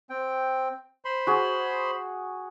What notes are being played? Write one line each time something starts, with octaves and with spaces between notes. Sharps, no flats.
C4 G5
C5 B5 C6
F#4 G#4